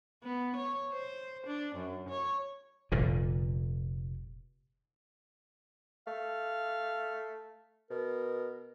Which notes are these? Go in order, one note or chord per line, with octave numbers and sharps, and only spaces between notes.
B3
C#5
C5
D4
F#2
C#5
F1 A#2 D3
A3 F5
B2 A#4